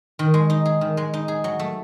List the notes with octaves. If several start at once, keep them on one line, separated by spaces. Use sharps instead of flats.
D#3
G#3
D#4
G#4
D#3
G#3
D#4
G#4
F#3
A3